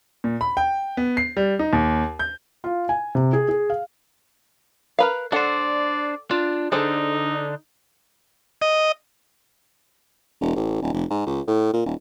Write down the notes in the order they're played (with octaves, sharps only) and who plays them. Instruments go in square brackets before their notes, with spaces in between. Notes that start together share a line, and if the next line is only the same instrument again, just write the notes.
[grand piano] A#2
B5
G5
B3
C7
G3
D#4
D#2
G6
[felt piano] F4
G#5
C3
G#4
G#4
F5
[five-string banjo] A#4 B4 F5
[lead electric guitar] D4 C5 [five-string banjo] A4 F#5 [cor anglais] D5
[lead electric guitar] D4 [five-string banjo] F4
[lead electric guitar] D3 D4 [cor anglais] D#4 [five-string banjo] G#4 A4 C5
[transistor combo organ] D#5
[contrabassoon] E1
A1
D#1
F1
G#2
C#2
A2
A#2
D#1